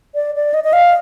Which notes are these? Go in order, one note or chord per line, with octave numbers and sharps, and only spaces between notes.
D5
D5
D#5
D#5
F5